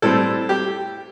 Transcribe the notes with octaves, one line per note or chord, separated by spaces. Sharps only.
A2 G3 C4 A4
G4